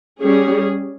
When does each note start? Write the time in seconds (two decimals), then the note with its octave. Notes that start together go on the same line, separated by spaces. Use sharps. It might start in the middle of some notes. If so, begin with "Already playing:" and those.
0.21 G3 C#4 G#4